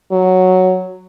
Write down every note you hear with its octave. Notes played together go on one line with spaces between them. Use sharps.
F#3